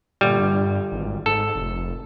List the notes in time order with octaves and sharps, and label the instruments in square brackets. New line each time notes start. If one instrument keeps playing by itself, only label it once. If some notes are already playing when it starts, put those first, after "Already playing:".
[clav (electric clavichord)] G1 G3 [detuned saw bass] A#2
[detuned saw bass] G2
G#1
[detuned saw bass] G#2 [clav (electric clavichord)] A4
[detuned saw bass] F1